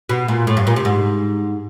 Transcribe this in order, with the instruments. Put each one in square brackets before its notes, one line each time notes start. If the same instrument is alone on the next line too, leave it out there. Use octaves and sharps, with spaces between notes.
[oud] B2
A#2
A2
G2
A#2
C3
G#2